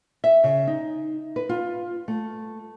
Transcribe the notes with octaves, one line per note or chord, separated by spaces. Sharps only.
E5
C#3
D#4
B4
F4
A3